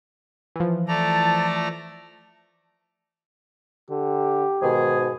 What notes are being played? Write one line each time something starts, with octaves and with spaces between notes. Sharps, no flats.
E3 F3
A3 D5 A5 A#5
D3 G4
G#2 B2 D#3 G#4